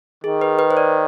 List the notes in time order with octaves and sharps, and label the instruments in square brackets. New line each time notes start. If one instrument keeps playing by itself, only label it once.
[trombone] D#3 [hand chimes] G#4
[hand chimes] B4
B4
C5
D5